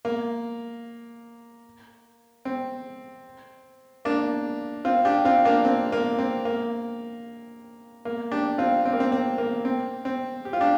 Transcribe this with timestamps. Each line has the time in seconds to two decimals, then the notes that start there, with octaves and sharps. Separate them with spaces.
0.05 A#3
2.45 C4
4.05 A#3 D4
4.85 C4 F4
5.05 D4 G4
5.18 G4
5.25 C4 F4
5.45 A#3 D4
5.65 C4
5.92 A#3
6.19 C4
6.45 A#3
8.05 A#3
8.32 D4 G4
8.58 C4 F4
8.85 C4
8.93 A#3
9.00 C4
9.12 C4
9.38 A#3
9.65 C4
10.05 C4
10.45 G4
10.53 F4
10.61 D4 G4